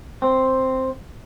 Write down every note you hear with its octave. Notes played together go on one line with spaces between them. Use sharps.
C4